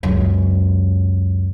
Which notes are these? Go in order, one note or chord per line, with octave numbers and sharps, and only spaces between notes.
C#2 F#2